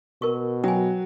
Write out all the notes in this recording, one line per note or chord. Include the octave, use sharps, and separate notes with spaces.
B2 A#4 C#6
F#3 G5 G#5